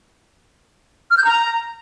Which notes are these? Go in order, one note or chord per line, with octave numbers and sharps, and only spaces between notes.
F6
G6
A#5